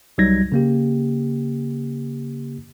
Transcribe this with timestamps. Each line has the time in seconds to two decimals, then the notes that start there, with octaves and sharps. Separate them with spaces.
0.18 C2 F#3 G3 D#4 G#6 A#6
0.52 C#3 A#3 G4